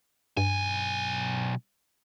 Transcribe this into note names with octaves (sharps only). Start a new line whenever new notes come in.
B1 G2 G#5